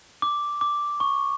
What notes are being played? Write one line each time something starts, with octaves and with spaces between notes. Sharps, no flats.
D6
D6
C#6